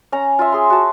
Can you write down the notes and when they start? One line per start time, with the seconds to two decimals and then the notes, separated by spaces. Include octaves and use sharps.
0.12 C#4 A#5
0.39 F4 E5
0.52 G#4 C6
0.70 F#4 A5